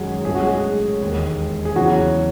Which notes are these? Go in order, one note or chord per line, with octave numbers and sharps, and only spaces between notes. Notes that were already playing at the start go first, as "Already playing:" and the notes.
Already playing: F#2 D#3 F#3 G#3 F#4 G#4
B1 A2 F#3 A3 C#4 G#4
F#4
G#3 G#4
E1 D#2 D#3
G#4
E2 C#3 E3 F#3 F#4